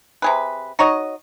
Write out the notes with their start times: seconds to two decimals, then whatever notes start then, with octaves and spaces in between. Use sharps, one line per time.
0.22 C3 G#4 B4
0.79 D#4 F#4 C#5 D#5